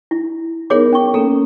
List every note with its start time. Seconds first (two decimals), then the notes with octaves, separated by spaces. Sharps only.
0.11 E4
0.70 B3 D#4 G#4 A#4 C#5 D6
0.93 C#4 C#6
1.14 A#3 C#4 A4